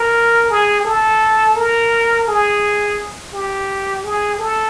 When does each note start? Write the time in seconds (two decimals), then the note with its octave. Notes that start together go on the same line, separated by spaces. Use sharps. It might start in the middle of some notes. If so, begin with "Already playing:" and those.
Already playing: A#4
0.50 G#4
0.85 A4
1.56 A#4
2.28 G#4
3.33 G4
4.04 G#4
4.39 A4